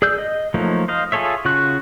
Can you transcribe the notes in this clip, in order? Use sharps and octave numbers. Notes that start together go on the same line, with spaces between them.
G#4 D5 E6 G6
D#5
F3 F#3 A3 A#3 D#4
C5 D#5 F5
F4 G#4 A4 C#5 E5
C#3 F4 F#4 C#6 F#6